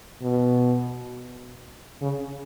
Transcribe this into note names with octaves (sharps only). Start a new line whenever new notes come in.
B2
C#3